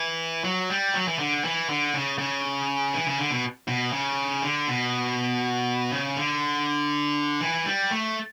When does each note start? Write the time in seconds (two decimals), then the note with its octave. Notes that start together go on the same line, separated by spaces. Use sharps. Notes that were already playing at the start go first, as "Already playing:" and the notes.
Already playing: E3
0.44 F#3
0.70 G3
0.94 F#3
1.08 E3
1.19 D3
1.44 E3
1.69 D3
1.94 C#3
2.19 C#3
2.93 E3
3.06 C#3
3.18 D3
3.31 B2
3.68 B2
3.93 C#3
4.42 D3
4.68 B2
5.91 C#3
6.17 D3
7.41 E3
7.66 G3
7.91 A3